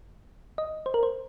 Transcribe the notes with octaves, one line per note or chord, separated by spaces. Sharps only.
D#5
C5
A#4
C5